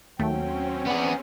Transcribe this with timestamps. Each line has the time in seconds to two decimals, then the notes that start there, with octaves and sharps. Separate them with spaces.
0.19 D#2 F#3 A3 C4 C#4 G5
0.86 B3 G#4 D5